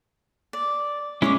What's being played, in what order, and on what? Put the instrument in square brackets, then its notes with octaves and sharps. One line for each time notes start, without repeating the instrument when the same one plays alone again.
[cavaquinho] D5
[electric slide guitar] G#3 C#4 E4 [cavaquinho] G#4 C#5 D6